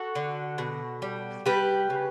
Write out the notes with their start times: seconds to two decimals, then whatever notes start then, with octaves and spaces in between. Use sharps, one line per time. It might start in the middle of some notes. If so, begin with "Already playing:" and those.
Already playing: F#4 A4
0.15 D3
0.58 B2
1.02 G3
1.46 G3 G4 B4
1.90 C#3